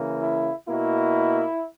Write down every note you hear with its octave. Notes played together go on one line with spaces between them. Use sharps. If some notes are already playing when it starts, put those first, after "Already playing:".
Already playing: C#3 E3 A#3
E4
B2 A#3 E4